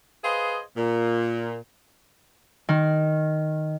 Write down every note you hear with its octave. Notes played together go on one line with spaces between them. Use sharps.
G#4 B4 C5 D#5 F5
A#2
D#3